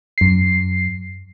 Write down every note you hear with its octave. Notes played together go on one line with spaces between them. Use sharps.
F#2 C7